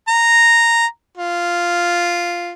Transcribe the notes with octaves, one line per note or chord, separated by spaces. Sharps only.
A#5
F4